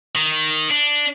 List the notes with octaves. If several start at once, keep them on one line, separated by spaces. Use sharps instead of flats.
D#3
D4